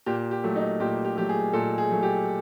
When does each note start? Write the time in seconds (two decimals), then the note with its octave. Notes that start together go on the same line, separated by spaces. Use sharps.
0.06 A#2 G4
0.31 G4
0.44 F#3 A3
0.56 D#4
0.80 A#2 G4
1.05 G4
1.17 F#3 A3 G4
1.29 G#4
1.53 A#2 A4
1.78 G#4
1.90 F#3 A3
2.03 G4